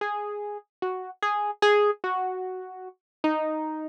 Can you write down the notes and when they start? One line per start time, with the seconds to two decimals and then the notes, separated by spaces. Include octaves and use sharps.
0.01 G#4
0.82 F#4
1.23 G#4
1.62 G#4
2.04 F#4
3.24 D#4